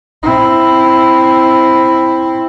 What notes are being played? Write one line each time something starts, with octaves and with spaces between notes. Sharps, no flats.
C4 E4